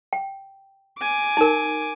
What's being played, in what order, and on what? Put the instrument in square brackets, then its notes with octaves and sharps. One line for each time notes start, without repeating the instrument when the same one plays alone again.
[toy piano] G5
[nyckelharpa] G#5 D6
[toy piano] D#4 A#4